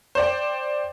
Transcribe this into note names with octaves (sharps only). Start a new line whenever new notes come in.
C5 D5 G5